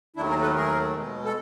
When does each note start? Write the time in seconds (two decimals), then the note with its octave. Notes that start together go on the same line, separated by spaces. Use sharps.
0.16 D#2 D#3 F#3 A3 D4 E4
0.29 G#4 A#4
0.42 A4 B4
0.54 D#2 D#3 F#3 A3 G#4 A#4
0.93 B2 G#3
1.25 A4